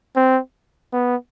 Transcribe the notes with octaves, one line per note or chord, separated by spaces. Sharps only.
C4
B3